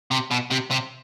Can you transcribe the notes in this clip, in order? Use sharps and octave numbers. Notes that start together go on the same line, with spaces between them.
C3
B2
C3
C3